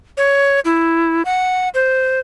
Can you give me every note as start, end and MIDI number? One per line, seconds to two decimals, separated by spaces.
0.17 0.60 73
0.65 1.22 64
1.25 1.69 78
1.74 2.20 72